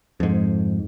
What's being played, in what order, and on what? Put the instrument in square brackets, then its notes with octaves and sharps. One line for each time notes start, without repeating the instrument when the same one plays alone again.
[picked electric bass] F2 G#2